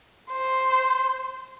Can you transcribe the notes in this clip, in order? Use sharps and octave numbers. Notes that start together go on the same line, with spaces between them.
C5